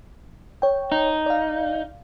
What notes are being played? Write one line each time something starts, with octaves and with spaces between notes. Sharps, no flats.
C#5 G5
D#4
D5 F5